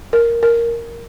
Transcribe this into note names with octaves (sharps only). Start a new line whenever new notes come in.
A#4
A#4